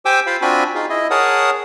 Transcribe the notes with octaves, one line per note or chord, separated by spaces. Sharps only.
G4 C5 G5 G#5 D6 E6
F4 C5 F5 B5
C4 D4 F4 F#4 G#5 B5
D#4 F4 G#4
E4 D#5
G#4 A#4 C#5 F#5 A5 D#6